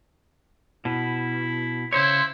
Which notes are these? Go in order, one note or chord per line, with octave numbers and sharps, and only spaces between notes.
B2 E4
C#3 E4 C5 C#5 C6